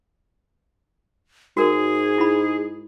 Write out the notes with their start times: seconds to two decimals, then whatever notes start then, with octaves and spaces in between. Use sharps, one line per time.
1.57 G#2 F#4 G#4 A#4
2.18 E4 B5